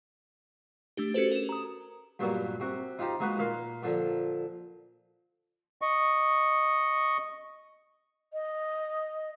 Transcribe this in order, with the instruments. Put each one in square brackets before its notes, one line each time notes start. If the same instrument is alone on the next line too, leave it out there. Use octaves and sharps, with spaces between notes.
[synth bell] A3 D4 G4
C#4 F#4 G4 A4 B4 C5
A#4 E7
A#5 D#6
[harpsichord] G2 A#2 F#3 A#3 B3 F#4
C3 F#4
D#4 F4 G4 C5 A#5
G#3 A#3 D#4 F#4 B4
A#2 A#3 A#4 F5 C6
A#2 D3 F3
[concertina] D#5 C#6
[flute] D#5